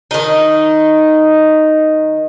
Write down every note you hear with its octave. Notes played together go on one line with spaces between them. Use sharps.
D#3 D#4